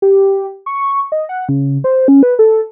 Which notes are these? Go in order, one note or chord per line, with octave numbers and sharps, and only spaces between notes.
G4
C#6
D#5
F#5
C#3
C5
C#4
B4
A4